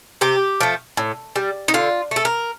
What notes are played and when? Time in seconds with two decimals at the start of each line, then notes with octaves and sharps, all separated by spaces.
0.21 C3 G4
0.60 F3 A3
0.97 A2
1.36 G3
1.68 D#4
1.74 D3 F4
2.11 A3 A4
2.25 A#4